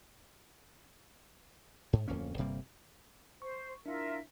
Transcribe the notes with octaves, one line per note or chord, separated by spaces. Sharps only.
G#2
D1 F2 A#3 C#4
G1 C3 G3 A#3
C5 C#6
D4 E4 F4 A#4 E5